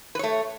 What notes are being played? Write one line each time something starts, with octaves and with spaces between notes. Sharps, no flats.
A3 B4 C#5